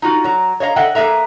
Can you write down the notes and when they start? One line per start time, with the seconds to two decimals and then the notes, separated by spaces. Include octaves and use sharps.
0.02 D#4 F4 F#4
0.24 F#3 A#5
0.60 C#5 D#5 F5 A#5
0.76 A4 D#5 E5 F#5 G5
0.95 A#3 G#4 B4 E5 A#5